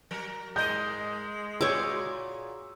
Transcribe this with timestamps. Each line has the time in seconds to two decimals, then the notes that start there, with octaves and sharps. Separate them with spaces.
0.11 F#3 A#4
0.56 G#2 G#3 A#4 D#5 G6
1.61 A#2 F#4 G#4 C#5 D6 E6